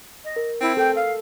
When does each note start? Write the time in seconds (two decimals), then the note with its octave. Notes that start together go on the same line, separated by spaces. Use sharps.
0.24 D#5
0.36 A#4
0.61 C4 E4
0.77 A4 G5
0.95 F5